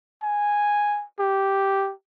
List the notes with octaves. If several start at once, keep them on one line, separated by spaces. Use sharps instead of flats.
G#5
G4